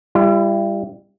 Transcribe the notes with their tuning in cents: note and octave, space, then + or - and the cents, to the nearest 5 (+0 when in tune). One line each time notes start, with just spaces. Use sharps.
G3 +20 E4 +45